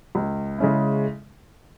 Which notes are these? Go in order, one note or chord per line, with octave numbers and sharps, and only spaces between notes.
C#2
C#3 G#3 C#4 E4